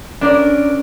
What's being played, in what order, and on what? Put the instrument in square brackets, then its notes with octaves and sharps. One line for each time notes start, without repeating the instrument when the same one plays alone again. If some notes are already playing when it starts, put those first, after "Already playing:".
[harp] C#4 D5 [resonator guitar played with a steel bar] D4 A#4